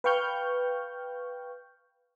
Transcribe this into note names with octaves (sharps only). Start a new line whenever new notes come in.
B4 F5 G5 C#6 F6 G6